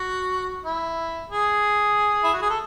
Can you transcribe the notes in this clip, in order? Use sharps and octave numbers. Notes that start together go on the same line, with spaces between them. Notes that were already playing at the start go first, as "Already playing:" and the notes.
Already playing: F#4
E4
G#4
E4
F#4
G#4
A4